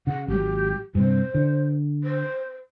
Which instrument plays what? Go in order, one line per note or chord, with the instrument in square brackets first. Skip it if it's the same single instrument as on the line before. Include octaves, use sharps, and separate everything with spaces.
[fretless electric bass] C#3 [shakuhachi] F#5
[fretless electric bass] G#1 F#3 [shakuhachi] G4
[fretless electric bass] G2 C3 [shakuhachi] C5
[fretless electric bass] D3
[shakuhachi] C5